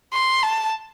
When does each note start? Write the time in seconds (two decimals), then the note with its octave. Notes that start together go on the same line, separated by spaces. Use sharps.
0.13 C6
0.43 A5